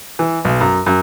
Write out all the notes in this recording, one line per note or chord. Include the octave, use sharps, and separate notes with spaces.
E3
B1
F#2
F#2